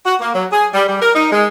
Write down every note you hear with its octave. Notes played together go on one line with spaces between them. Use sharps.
F#4
A#3
F#3
G#4
G3
G3
A#4
D#4
G#3